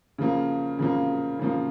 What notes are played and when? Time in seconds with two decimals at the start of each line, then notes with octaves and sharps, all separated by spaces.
0.18 C#3 F3 A#3
0.79 C#3 F3 A#3
1.39 C#3 F3 A#3